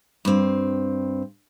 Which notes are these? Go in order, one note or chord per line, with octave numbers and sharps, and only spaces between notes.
G2 C4